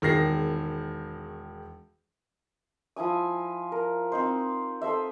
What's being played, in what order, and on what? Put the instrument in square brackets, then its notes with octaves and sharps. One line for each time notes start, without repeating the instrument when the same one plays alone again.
[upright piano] E1 D#3 G#3 A#6 C7
[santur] F3 E4 G#5 D#6
A#4
C4 D#4 C5
A4 C5 D#5 E5